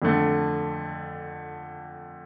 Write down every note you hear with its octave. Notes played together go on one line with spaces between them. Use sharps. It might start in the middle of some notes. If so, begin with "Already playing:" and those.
F2 D3 A3